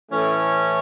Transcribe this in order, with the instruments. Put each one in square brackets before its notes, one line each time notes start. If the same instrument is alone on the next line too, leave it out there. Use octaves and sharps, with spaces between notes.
[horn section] A2 E3 A3 C#4